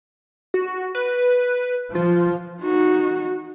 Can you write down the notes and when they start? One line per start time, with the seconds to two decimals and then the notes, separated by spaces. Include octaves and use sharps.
0.54 F#4
0.95 B4
1.95 F3 F4
2.63 D#4 F#4